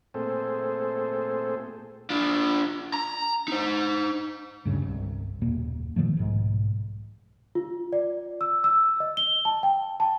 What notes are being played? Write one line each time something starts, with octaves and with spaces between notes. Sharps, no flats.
A#2 A3 C4 G#4 A4 C5
D4 F4
A#5
D#4 C5
D2 G2 C#3
G1 C2
F#1 D#2 A#2 A#3
A#2 D#3 F3 A3
B1 G#2
F4
D5
E6
E6
D#5
G7
A5
G5
A5